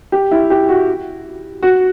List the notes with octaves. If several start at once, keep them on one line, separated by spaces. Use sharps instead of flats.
G4
E4
G4
F#4
F#4